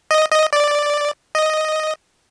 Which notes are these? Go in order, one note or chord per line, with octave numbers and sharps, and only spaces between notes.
D#5
D#5
D5
D#5